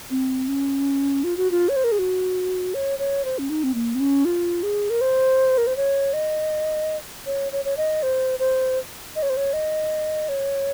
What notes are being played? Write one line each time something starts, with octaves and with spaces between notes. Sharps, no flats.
C4
C#4
F4
F#4
F4
C#5
C5
A#4
G#4
F#4
C#5
C#5
C5
C#4
D#4
C4
A#3
C4
C#4
F4
G#4
A#4
C5
A#4
C5
C#5
D#5
C#5
C#5
C#5
D#5
C5
C5
D#5
C#5
C5
C#5
D#5
C#5